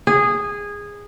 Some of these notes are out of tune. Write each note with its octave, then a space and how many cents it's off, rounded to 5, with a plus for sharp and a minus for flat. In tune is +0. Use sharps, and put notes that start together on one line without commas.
G#4 -15